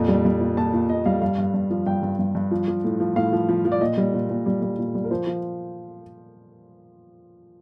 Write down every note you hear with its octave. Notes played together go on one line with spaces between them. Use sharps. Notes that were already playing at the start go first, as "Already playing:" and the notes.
Already playing: F2 A#2
G3
G3
A#2
A#2 A5
A#2
A#2 D#5
G3 F5
G2 F5
G2
G2
F3
G2 G5
G2
G2
G2
F3
F3
A2
F3
A2 F5
F3
F3
F3
D5
A#2 D#5
G3
A#2
A#2
G3
G3
A#2
G3
A#4
F3 C5
F3